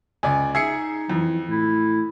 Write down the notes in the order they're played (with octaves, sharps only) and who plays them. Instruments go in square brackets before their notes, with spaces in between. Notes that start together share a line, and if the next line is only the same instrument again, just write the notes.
[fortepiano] C#2 D5 [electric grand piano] G#5
[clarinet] D#4 [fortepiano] G#4 E5 [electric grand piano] G#6 C7 C#7
[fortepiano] F2 [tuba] E3
[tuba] A2 [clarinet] E4